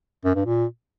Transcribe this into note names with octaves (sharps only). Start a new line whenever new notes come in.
F#2
G2
A#2